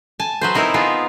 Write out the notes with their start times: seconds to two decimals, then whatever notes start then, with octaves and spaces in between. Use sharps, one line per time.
0.20 G#5 A5
0.41 F#3 B4 C5
0.55 C4 D#4 E4 A#4
0.74 B3 C4 F4 G#4